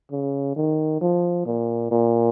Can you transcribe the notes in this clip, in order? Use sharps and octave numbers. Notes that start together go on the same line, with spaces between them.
C#3
D#3
F3
A#2
A#2